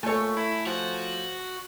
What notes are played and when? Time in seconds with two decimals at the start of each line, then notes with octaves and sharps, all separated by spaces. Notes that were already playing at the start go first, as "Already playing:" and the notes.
0.03 A#2 A3 A4 C#5 G#5
0.36 E4
0.66 F3 F#4